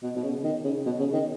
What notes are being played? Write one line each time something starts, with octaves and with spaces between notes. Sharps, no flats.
B2
B2
C#3
D#3
C#3
B2
C#3
D#3